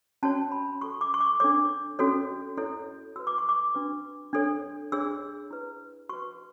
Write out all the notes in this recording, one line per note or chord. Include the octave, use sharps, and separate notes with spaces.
C#4 F#4 C#5 A5
B5
F#4 A4 C#5 C#6
D6
C#6
D6
D4 A4 C#5 D6
C#4 F#4 A4 C#5
E4 A4 C#5
F#4 B4 E6
D6
C#6
D6
D4 F#4 B4
D4 A4 C#5
D4 G#4 C#5 E6
E4 B4
F#4 B4 C#6